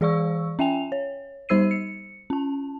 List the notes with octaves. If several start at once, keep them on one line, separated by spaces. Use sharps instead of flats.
E3 G#4 D5 F5 C#6 E6
C#4 E5 G5 G#5 F7
C#5
G3 D#4 C5 E6 C7 D#7
C#7
C#4 A5